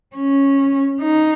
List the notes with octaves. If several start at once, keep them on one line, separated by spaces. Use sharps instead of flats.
C#4
D#4